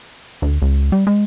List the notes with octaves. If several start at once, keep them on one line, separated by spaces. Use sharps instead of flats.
D2
C#2
G3
G#3